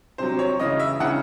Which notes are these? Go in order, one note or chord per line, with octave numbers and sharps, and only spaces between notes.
C3 F#3 C5
C#5
C#3 E3 D#5
E5
C#3 E3 F#5